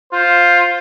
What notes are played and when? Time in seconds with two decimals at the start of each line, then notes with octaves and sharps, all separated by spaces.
0.13 F4 C5